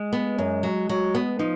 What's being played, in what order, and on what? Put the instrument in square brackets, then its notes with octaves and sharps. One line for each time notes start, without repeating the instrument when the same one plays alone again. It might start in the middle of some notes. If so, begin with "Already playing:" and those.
Already playing: [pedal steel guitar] G#3
[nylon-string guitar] B3
F#2
F#3
F#3
B3
[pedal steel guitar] F3 [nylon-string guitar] D#4